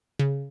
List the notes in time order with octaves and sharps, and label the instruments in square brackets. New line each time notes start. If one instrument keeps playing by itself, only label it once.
[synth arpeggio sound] C#3